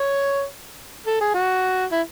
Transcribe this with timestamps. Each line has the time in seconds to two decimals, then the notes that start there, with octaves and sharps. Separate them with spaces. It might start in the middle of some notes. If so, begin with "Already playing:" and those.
Already playing: C#5
1.06 A4
1.21 G#4
1.34 F#4
1.92 E4